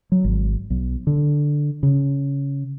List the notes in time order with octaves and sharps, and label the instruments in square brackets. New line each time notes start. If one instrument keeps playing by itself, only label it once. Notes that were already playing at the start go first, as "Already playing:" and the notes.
[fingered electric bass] F#3
G#1
B1
D3
C#3